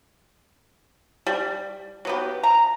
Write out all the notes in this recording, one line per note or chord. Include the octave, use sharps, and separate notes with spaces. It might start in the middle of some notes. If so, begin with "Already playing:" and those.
G3
F#3 B3 G4
A#5